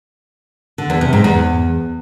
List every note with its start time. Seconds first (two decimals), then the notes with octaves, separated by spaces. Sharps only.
0.78 D3
0.90 E2
1.01 C3
1.13 G#2
1.24 E2